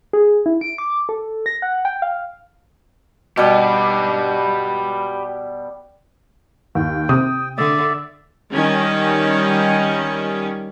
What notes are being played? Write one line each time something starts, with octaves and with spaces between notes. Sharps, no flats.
G#4
E4
D7
D6
A4
A#6
F#5
G5
F5
B2 G3 G4 B4
D#2 G5
C3 D#6
D3 D5 E5
D#3 G3 C#4